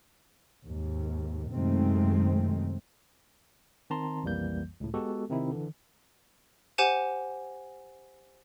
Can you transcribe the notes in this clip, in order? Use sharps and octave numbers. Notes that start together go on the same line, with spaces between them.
D#2 G#2
F#2 C3 D#3 G#3 A3 C4
D#3 C4 A5 A#5 C6
B1 F2 E3 G3 A#3 G6
C#2 A2
G#3 B3 F#4 G4 A4
C3 D#3 C4 D#4 E4
D3 E3
G4 C5 F#5 G#5 E7